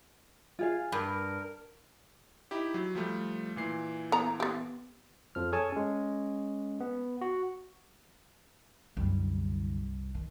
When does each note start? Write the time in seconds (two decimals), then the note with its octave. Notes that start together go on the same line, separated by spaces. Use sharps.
0.59 F4 G#4 F5
0.92 G2 A#4 B5
2.51 D#4 E4 G4
2.74 F#3
2.95 F3 G3 A3
3.56 A#2 E3 C7
4.12 B3 A#5
4.40 B3 G4
5.35 F2 F3 F6
5.52 G#4 A4 C#5 G#5 A5
5.72 G#3 C#4
6.80 B3
7.21 F#4
8.97 C2 F#2 D3 G3
10.15 D#3